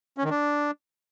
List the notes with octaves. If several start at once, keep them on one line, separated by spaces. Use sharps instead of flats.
C#4
D#3
D4